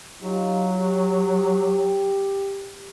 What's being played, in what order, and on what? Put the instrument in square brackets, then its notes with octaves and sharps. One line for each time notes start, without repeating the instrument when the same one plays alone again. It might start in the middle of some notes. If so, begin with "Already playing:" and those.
[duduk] F#3 [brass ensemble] D#4 F4 G4
[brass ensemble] G4